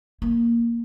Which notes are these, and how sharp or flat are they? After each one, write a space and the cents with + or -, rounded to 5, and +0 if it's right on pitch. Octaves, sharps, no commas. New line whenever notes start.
A#3 +0